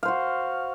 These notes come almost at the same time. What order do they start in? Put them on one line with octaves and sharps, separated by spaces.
F5 C5 F#4